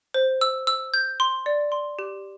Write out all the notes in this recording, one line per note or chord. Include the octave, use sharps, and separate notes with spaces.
C5
E6
E6
G6
C6
D5
C6
G4